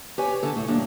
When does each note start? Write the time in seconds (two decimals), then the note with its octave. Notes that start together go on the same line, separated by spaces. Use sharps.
0.18 G4 B4 C#5 G#5
0.43 D3 A4
0.56 A2
0.68 D#2 G3 A#3 D4